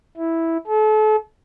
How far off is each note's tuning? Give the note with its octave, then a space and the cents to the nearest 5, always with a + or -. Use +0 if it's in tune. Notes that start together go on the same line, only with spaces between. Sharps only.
E4 -5
A4 -35